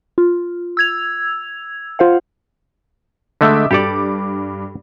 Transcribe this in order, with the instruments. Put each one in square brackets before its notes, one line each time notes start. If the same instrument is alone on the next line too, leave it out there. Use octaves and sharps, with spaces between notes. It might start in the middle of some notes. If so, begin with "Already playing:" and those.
[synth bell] F4
E6 G#6 F7
F4 C5 F5 F#5
[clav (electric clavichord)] D3 G#3 A3 [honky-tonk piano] D#5 E5 D6
[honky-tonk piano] G2 D6 [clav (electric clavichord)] G4 A4 D5